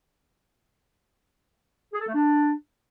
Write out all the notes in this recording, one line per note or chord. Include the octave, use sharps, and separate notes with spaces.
G#4
A4
A3
D4